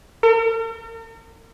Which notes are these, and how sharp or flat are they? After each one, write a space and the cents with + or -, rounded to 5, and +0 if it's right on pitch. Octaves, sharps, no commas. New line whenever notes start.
A#4 -45